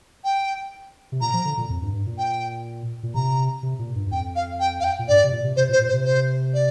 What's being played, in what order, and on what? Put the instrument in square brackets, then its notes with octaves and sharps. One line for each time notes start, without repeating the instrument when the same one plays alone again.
[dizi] G5
[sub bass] C3
[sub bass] A#2 [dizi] A#5
[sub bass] F3
D3
A#2
F2
G2
G2
A#2
[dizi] G5
[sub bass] A#2
[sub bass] C3 [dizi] A#5
[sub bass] C3
A#2
G2
G2
[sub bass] F2 [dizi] G5
[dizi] F5
G5
F5
G5
[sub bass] A#2
[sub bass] G2 [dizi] D5
[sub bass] C3
A#2
C3
[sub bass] C3 [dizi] C5
[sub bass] A#2
[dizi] C5
[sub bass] A#2
[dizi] C5
[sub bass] C3
[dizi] C5
D5